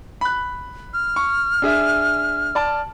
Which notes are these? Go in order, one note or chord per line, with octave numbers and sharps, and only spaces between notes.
B5 F#6
F6
C#6
D4 G#4 E5
D5 A5